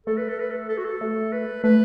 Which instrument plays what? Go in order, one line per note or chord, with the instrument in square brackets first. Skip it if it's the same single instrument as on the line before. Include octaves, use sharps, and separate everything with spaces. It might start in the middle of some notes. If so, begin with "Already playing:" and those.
[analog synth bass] A3 [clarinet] A4
[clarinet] B4
A4
B4
A4
A4
F#4
A4
[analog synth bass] A3
[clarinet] B4
[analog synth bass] A3 [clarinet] B4